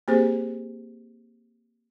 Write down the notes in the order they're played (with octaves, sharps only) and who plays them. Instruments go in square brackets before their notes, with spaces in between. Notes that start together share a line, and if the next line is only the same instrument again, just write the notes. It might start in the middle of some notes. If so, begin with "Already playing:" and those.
[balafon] A#3 C4 G4 G#4 C5